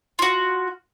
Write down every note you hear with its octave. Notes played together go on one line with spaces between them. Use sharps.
F4 F#4